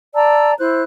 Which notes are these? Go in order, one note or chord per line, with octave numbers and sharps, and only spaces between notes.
D5 A5 A#5 E6
E4 C5 F#6